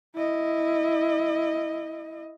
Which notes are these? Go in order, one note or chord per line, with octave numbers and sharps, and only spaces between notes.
E4 D#5